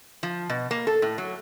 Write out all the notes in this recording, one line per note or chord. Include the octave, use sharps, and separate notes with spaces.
F3
B2
A#3
A4
A2
F#3